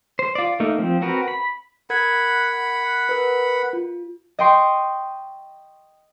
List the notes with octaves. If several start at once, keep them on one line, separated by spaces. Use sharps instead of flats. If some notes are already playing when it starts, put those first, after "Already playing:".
C5
F4 D5
A3 A#3 D#4
F3 C4
C4 F#4 A#4 B4
B5
A#4 F#5 B5 G#6
A#4 B4
F4
D#5 G5 C6 C#6